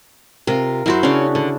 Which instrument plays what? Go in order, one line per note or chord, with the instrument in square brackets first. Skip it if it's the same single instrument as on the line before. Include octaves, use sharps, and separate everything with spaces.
[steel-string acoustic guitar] C3 F4 [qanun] A#4
[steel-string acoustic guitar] F#2 F#3 [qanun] E4 F#4 C5
[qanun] C#3 D4 [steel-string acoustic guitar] C#4
[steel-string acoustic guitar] D3